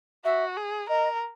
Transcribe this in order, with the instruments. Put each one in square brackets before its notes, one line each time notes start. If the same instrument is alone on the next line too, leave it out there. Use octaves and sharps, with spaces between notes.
[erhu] F#4 [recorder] E5
[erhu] G#4
[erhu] A#4 [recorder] D#5